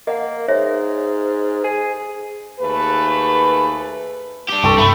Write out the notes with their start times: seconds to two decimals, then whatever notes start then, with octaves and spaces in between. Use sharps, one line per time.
0.07 A#3 D#5 F#5
0.48 G#2 C#5 E5
1.64 G#4
2.60 D#2 A3 G#4 B4
4.49 D4 G4
4.63 C2 G2 A4 G5 C6 C#6
4.78 A3 B5 D#6